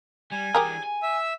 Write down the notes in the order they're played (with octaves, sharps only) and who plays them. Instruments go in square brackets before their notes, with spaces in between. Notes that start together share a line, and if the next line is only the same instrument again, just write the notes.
[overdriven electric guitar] G3 [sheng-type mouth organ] G#5
[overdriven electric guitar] E3 D4 [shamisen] G4 G#4 A#4
[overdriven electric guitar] G#5
[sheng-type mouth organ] E5 E6